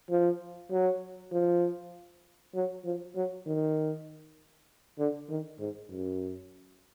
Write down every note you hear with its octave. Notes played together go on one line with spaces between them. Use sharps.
F3
F#3
F3
F#3
F3
F#3
D#3
D3
D#3
G#2
F#2